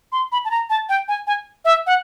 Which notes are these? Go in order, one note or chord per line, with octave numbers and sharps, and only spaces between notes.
C6
B5
A5
A#5
A5
G5
G#5
G#5
E5
F#5